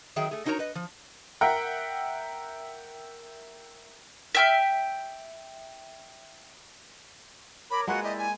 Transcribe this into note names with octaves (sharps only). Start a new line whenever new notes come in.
D#3 F#3 G#4 E5 G5
A3 G#4
D4 D#4 F#4 A#4 C#5 A#5
B4 D#5
F3
A#4 E5 F#5 G5
E5 G5 F6
A#4 C#5 B5 D6
G#3 A#3 F4 F#4 B4 F#5 G#6
E4 G4 D5 D#5
G#5